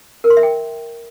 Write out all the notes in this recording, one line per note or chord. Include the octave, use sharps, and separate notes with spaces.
A#4
C6
E5
G5